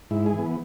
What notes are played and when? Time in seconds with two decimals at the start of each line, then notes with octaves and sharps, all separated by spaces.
0.11 G#2 E4
0.26 G#4
0.33 E3 B3